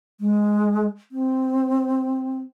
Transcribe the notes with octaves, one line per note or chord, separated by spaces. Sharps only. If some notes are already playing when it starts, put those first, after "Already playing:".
G#3
C4